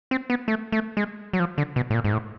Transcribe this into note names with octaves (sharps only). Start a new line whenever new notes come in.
C4
B3
A3
A3
G#3
F#3
F3
D3
B2
A2
A#2
G#2
A2